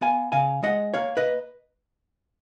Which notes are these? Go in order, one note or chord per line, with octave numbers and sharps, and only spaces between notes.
B3 F5 G#5
C#3 F5 G#5
G#3 D#5 F#5
A#3 C#5 F5
B4 D#5